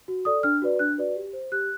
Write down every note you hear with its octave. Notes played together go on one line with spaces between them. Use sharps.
F#4
A4 D5 D#6
D4 F6
F#4 B4 D5
D4 F#6
F#4 B4 D5
G4
C5
G4 F#6